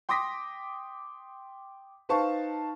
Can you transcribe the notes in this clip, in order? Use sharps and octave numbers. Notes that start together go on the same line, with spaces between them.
G5 C6 D6 D#6 A#6 B6
D#4 B4 C5 F5 A5 C#6